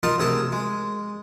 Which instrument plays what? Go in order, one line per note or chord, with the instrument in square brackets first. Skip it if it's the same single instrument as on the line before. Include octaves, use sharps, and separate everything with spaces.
[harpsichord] D#4 F4 A#4 A5 D#6
D2 C3 G#4 A#4 A5 D#6
G#3